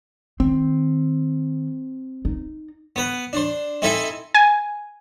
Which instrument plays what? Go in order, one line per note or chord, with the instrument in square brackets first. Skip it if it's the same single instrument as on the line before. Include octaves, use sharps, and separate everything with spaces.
[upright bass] D#3 [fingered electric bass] C4
[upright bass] D#4
[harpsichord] B3 B4
D4 C5
C4 D#4 E4 A4 E5 G#5
[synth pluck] G#5